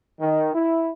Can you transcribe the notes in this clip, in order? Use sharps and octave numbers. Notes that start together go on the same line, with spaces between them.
D#3
E4